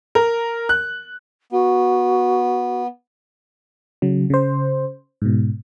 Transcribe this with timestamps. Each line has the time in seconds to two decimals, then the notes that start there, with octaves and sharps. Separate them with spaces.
0.15 A#4
0.69 F#6
1.52 B3 F#4
4.02 C#3 F#3
4.30 C#3 C5
5.22 G#2 B2